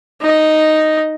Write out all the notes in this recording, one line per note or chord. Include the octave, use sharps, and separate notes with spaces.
D#4 D#5